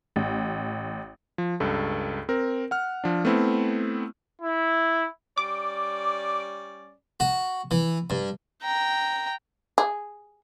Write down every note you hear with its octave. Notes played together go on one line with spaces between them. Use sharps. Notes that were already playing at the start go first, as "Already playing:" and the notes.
A1
F3
C#2 G2 A4
C4 A#4
F#5 F6
F3 D4
A3 B3 C4 E4
E4
G3 C#4 D5 D6
F#4
E3
G2
G5 A#5
G#4